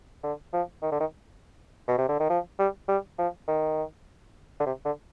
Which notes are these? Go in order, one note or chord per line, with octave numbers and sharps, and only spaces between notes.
D3
F3
D#3
D3
D#3
B2
C3
D3
D#3
F3
G3
G3
F3
D#3
D3
C3
D3